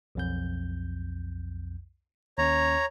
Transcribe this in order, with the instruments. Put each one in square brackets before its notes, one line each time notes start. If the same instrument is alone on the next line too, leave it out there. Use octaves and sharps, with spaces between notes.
[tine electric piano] B1 F2 G6
[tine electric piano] D#2 C#4 [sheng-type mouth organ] C#5 A#5